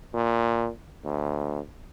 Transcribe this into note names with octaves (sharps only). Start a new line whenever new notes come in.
A#2
D2